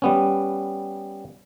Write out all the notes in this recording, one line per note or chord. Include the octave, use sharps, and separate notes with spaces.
G3 B3 C#4